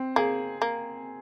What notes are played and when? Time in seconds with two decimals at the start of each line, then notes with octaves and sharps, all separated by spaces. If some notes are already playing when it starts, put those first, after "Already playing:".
Already playing: C4
0.16 A#3 G#4
0.62 A#3